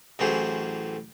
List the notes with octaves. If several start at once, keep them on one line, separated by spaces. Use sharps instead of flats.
A1 A2 E3 F#3 G#4 C5